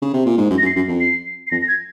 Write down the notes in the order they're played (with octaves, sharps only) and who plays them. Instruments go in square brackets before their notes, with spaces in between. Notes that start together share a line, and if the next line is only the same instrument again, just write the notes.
[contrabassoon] C#3
C3
A#2
G#2
F#2
[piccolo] A#6
[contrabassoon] F#2
[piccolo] C7
[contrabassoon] F#2
F2
[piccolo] C7
C7
[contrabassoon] F2 [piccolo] A#6
[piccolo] A#6
G#6